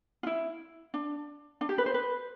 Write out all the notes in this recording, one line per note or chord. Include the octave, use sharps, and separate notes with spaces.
F4
E4
D4
D4
G4
B4
C5
B4